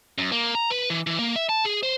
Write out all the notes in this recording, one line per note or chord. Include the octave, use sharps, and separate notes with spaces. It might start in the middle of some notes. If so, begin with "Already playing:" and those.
F#2
A#3
A#5
B4
E3
E3
A#3
E5
A5
G#4
C5